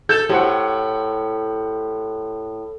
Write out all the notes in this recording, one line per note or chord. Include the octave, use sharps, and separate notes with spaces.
A4 G6 E7
A2 G4 C5 F#5